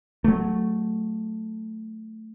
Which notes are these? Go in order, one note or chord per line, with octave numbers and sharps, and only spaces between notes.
F#3 A3